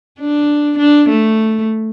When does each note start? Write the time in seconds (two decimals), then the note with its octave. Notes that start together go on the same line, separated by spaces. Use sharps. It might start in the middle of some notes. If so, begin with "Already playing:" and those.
0.19 D4
0.78 D4
1.09 A3